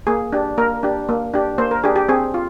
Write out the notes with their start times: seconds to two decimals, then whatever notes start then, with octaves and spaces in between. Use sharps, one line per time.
0.07 A#3 G#4
0.33 D4 G4
0.58 A#3 A#4
0.83 D4 G4
1.09 A#3
1.34 D4 G4
1.58 A#3 C5
1.71 A#4
1.84 D4 G4 G#4
1.96 G4
2.09 C4 G#4
2.34 F4